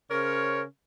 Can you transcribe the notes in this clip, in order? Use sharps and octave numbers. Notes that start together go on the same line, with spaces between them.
C#3 C#4 A#4 C5 C#5